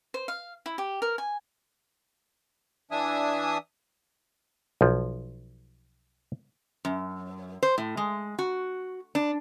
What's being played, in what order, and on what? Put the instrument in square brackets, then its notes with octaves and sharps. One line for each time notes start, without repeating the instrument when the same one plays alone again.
[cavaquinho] C5
F5
E4
G4
A#4
G#5
[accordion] E3 D4 E5 G#5 D#6
[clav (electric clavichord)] B1 F3
[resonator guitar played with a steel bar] F#2
C5
A2
G#3
F#4
D4